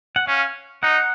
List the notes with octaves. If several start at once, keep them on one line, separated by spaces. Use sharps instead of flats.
F#5
C#4 F5
D#4 F#5